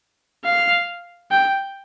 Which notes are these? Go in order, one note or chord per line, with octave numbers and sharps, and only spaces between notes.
F5
G5